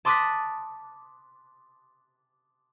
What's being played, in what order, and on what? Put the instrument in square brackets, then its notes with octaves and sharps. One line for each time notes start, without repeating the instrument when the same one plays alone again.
[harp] A5 C6 D6 D#6 F#6 B6